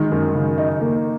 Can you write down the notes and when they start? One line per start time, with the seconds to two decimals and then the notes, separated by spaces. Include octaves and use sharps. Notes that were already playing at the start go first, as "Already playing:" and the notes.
Already playing: D#3 G#3
0.12 F#2
0.35 C#3
0.58 D#4
0.81 A#3